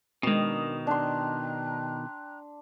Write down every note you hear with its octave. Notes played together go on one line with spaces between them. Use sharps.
B2 D#3 G#3 C4 D4 A#4 D#6
D4 G5 A#5 C6 F#6